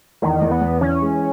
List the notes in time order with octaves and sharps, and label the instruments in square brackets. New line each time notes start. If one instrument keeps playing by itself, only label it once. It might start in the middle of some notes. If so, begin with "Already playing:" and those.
[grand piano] E2 [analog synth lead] D#3
[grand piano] E2
[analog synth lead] B3
[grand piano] E2
[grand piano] E3 [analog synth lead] C#4
[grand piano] G#3